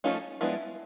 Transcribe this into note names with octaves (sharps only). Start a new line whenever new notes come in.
F3 A3 C#4 D#4 F4
F3 G#3 B3 D4 E4